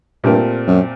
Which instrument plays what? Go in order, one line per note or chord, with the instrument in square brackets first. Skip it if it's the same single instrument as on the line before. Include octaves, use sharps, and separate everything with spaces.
[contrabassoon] G2 [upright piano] A#2 A3 C4 G4 A#4
[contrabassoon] F#2